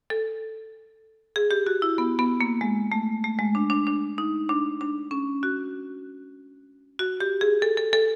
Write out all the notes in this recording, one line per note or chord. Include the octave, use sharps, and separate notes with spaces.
A4
G#4
G4
F#4
E4
B3
B3
A#3
G#3
A3
A3
G#3
D4
D4
D4
D#4
D4
D4
C#4
F#4
F#4
G4
G#4
A4
A4
A4